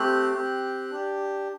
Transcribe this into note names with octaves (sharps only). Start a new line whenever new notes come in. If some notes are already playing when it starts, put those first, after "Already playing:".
Already playing: A3 C4 G4 F#6
C4 G4
D4 G4